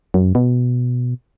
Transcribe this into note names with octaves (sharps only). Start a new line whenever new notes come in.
F#2
B2